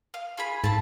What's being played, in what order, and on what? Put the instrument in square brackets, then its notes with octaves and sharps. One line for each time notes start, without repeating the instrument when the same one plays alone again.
[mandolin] F5
F4 G#4 B5
[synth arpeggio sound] G#2 [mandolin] C4 A5